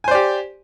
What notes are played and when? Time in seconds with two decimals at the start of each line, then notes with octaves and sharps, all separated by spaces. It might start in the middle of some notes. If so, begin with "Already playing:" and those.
0.04 G#5
0.08 C5
0.11 D5
0.15 G4